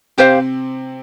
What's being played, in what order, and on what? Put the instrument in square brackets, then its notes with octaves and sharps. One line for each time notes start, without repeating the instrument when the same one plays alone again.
[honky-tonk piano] C3 C4 [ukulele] G4 C5 F5